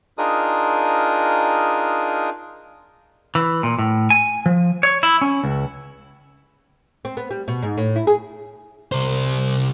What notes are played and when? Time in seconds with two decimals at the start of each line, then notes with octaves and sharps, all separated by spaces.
0.18 D4 D#4 F4 G#4 A#4 D#6
3.35 E3
3.63 A#2
3.79 A2
4.10 G#5
4.46 F3
4.83 C#5
5.03 E4
5.21 C#4
5.44 C#2
7.05 C4
7.17 B3
7.31 G3
7.48 B2
7.62 G#2
7.78 A2
7.96 E4
8.07 G#4
8.92 C2 C5